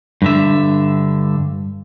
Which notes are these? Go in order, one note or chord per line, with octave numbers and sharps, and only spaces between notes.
G2 D3 E5